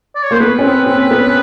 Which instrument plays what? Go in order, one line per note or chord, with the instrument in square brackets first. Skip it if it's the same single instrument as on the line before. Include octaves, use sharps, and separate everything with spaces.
[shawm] D5
C#5
[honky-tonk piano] A#3 [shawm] C5
[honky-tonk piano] B3 [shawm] B4
[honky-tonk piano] C#4
C4
C4
B3